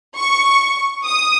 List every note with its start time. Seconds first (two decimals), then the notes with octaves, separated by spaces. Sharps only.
0.17 C#6
1.05 D#6